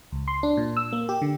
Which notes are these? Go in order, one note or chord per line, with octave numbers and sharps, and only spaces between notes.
C#2
C6
D4
A#2
E6
A#3
G4
D3